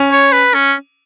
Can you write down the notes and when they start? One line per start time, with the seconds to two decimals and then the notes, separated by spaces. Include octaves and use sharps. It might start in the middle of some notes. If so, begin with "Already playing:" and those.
Already playing: C#4
0.11 C#5
0.33 B4
0.54 C#4